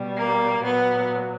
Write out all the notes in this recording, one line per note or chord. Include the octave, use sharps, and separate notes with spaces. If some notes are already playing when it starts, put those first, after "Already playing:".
Already playing: B2 G3
A#3
A#2 F#3 B3